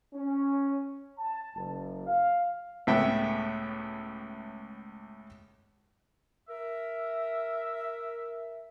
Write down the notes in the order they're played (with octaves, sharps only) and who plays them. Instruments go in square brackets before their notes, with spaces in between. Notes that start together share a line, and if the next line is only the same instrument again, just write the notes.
[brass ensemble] C#4
A5
F#1
F5
[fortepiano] C#2 A2 B3 E5 G5 G#5
[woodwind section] A#4 E5